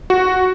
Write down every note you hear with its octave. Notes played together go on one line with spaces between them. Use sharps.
F#4